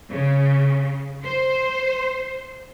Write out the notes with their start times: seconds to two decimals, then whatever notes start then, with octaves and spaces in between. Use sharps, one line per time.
0.11 C#3
1.25 C5